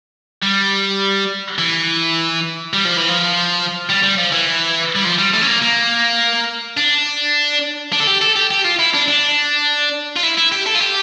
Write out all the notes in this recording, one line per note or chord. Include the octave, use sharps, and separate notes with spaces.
G3
E3
G3
F3
E3
F3
G3
G3
F3
E3
G3
F3
G3
A3
C#4
A#3
A#3
D4
D4
A4
G4
A4
G4
G4
F4
E4
D4
D4
F4
E4
E4
G4
A4
F4
G4